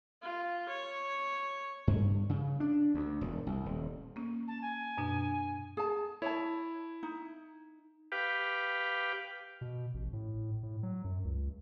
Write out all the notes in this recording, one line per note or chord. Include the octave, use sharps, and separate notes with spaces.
F4
C#5
G2
C#3
D4
D2
E1
C2
D#1
A#3 C#4
A5
G#5
F#2 B2 D4
G#4 A5
E4 C#5 A5
D#4
G4 B4 F5 G5 D6
B2
A1
A2
A2
F#3
F#2
C#2